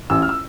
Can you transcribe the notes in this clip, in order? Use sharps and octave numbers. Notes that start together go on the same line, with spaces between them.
A1 E6
F6
E6